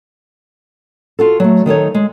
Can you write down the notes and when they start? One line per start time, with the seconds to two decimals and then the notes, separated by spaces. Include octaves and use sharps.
1.19 F4 F#4 A4
1.40 F#3 A3
1.66 D#3 D#4 A4 C#5
1.94 G#3